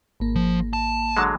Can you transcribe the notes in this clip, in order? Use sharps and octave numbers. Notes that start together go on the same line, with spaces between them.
G#1 A#3
F3
A5
D3 F#3 G#3